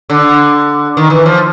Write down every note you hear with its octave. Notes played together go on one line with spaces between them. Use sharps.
D3
D#3
E3
F3